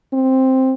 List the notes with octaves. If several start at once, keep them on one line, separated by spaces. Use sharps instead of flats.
C4